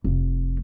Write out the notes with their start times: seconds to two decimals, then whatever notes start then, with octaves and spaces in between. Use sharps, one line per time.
0.04 F1